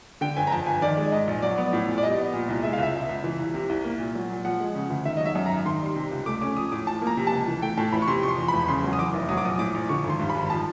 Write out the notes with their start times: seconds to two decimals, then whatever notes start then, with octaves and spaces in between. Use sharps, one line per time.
0.21 D3 G5
0.37 G1 G#5
0.47 A#5
0.51 F2 A5
0.66 G1 G#5
0.82 D#3 D5
0.98 G#3
1.12 G#2 D#5
1.27 A#1
1.42 F#3 D5
1.58 B3
1.73 A2
1.88 A#1
1.98 D5
2.03 G3 D#5
2.18 B3
2.33 A#2
2.49 C2
2.63 G#3 E5
2.73 F5
2.78 C#2 E5
2.94 B2
3.09 C#2
3.24 E3
3.39 C2
3.54 C3
3.69 C2
3.84 A#3
3.99 A#2
4.15 F#3
4.30 A#2
4.45 F3 F#5
4.60 G#3
4.75 C#3
4.90 D2
5.05 D#3 E5
5.17 F#3 D#5
5.26 E5
5.35 F#2
5.46 G#1 A#5
5.66 D#3 C6
5.81 G3 C6
5.96 C3
6.11 C#2
6.26 A3 D6
6.41 C#4 D6
6.56 F3 D#6
6.72 A2 D6
6.87 F3 A5
7.02 A#3 A#5
7.17 C3
7.27 C#2 A5
7.47 E3
7.62 A3 G5
7.77 A2 A5
7.92 A1 B5
8.02 C#6
8.08 C3 C6
8.23 F3 C#6
8.28 C6
8.38 E2
8.48 E1 B5
8.68 C#3 C6
8.84 F#3
8.93 D#6
8.99 E2 D6
9.13 F1
9.29 F#3 D#6
9.37 D6
9.44 A#1 D#6
9.59 A2 D6
9.74 A#1
9.89 D3 C#6
10.04 G#1
10.10 C6
10.20 G2
10.30 B5
10.35 G#1
10.50 F3 A5